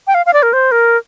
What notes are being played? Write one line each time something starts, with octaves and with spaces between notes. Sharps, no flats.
G5
F5
F5
D5
A#4
C5
A#4